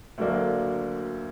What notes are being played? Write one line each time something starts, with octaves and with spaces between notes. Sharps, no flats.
D2 D3 F#3 A#3 D4